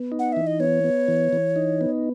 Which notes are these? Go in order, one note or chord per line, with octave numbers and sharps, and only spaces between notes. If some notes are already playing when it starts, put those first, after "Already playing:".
Already playing: B3
D#4
F#5
E3 E5
D#5
B3 C#5
B3
E3
E3
D#4
B3